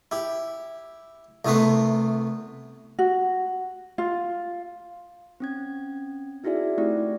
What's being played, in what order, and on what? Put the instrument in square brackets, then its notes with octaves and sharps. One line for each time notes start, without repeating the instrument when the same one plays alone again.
[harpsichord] E4 G4
C2 C3 A3 B3 B4 C6
[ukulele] F#4
F4
[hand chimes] C4 C#4 G#6
D#4 E4 F#4 G#4 D5 E5
A3 C4 E4 G4 D5